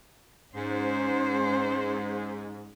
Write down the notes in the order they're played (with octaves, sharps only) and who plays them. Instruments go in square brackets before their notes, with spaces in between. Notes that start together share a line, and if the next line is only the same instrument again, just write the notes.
[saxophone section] G#2 [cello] C#4 C5